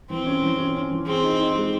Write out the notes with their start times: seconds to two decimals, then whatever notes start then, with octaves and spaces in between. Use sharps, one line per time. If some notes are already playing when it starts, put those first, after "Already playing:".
0.10 E3 C4
0.26 C#4
0.42 E3
0.58 C#4
0.75 C#4
0.91 E3
1.06 C4 G#4
1.23 D#4
1.40 D#4
1.56 G#3